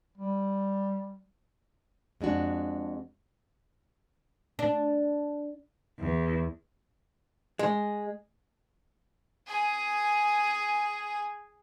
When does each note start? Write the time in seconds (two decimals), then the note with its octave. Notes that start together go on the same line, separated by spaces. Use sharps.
0.18 G3
2.21 F2 G#3 D4 F#4
4.59 D4
5.99 E2
7.59 G#3
9.47 G#4 G#5